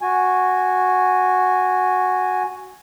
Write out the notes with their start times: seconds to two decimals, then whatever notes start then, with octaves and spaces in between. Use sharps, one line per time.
0.01 F#4 G#5